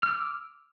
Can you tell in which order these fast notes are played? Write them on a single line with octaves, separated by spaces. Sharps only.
F6 E6 D6